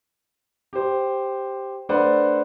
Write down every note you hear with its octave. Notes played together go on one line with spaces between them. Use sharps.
G4 C5
A3 D4 B4 C5 D5 F#5